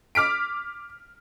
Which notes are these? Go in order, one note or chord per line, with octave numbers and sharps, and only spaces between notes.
D6 F6 B6 D7